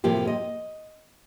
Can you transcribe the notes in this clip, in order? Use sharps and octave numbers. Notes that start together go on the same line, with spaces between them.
A2 C3 F3 A#3 G4
D#5